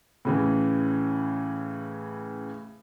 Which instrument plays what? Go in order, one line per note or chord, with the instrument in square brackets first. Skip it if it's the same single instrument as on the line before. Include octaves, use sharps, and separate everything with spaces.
[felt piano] A2 C#3 E3